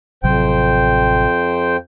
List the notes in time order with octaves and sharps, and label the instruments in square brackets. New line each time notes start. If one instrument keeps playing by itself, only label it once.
[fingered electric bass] A1 C3 F#3 [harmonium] F2 C5 G5